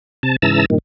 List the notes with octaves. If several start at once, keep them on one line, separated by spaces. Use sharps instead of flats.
C3 A5
G#2 C#3 E3 A5 A#5 E6
G2 A#2 D#3